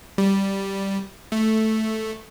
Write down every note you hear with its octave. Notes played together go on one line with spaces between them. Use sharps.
G3
A3